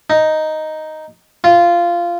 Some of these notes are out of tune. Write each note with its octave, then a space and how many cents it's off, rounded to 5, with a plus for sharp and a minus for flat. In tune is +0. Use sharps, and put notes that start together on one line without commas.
D#4 +0
F4 -10